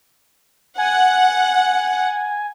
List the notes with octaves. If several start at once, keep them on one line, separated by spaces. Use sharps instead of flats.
F#5 G#5